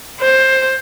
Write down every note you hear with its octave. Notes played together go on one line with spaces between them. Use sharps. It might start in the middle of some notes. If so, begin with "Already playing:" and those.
C5